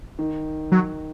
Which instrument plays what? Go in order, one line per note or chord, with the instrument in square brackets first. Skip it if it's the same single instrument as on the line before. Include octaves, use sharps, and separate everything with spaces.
[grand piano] D#3
[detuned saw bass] F#3